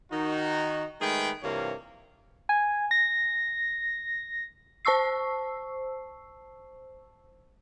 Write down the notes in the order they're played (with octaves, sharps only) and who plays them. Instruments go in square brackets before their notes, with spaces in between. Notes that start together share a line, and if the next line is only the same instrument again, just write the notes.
[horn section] D#3 D#4 F#4
D#3 G#3 A3 G#4 B4 G5
G2 C3 E3 A#3 F4 C#5
[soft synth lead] G#5
A#6
[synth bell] C5 A5 C#6 E6 C7